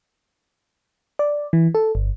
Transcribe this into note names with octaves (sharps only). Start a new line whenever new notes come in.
D5
E3
A4
G1